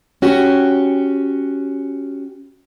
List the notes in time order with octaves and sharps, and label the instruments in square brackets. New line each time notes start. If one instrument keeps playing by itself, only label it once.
[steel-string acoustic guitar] C#4 F#4 G4